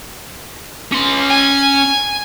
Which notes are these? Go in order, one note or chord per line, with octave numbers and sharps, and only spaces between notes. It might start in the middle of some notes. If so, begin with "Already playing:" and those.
C#4 C6
G#5